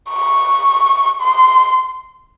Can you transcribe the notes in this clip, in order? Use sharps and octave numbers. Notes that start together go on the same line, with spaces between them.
C#6
C6